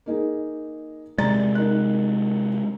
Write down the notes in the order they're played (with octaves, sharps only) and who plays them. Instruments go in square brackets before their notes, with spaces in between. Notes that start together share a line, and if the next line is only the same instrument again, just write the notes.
[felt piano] A#3 D#4 G#4
[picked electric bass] C3 G#3 [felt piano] D5 A#5 A6
[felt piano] D#4 A#4 F#6